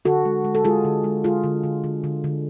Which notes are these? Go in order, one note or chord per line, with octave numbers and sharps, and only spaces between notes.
D3 F#4 A4
G#3
G#3
A4
G#3 F4 G#4
D3
G#3
G#3 F4 G#4
D3
D3
D3
D3
D3